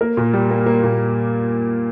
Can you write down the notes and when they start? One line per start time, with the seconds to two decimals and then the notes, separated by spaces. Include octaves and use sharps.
0.01 A#3 A#4
0.17 A#2
0.33 G3
0.51 A#3
0.66 A#3
0.83 A#2